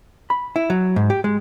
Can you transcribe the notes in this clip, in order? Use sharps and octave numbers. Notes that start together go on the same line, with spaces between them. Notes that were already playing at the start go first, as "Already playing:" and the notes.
B5
E4
F#3
G#2
G4
G#3